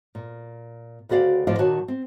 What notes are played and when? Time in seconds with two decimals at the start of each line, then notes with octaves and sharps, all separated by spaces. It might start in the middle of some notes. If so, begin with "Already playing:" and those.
0.15 A#2
1.09 D2 C#3 F#4 D5 F5 G5
1.47 D2 A2 F3 D5 D#5 F5
1.58 A#2 D#3 F#3 F#4 C#5 A5
1.88 C4